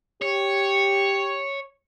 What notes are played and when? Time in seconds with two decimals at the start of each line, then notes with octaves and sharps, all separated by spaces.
0.22 G4 C#5